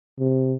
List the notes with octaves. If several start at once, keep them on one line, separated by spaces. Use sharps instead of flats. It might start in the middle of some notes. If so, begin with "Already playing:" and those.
C3